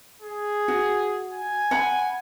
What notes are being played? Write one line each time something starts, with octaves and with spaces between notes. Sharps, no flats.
G#4
F#4
G#5
F#5 B5